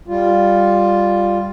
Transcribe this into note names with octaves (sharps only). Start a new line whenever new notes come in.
G3 F4